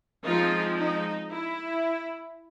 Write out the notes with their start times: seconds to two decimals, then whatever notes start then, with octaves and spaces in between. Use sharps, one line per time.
0.24 F3 G#3 C4 D#4 F4
0.77 D#4
1.30 E4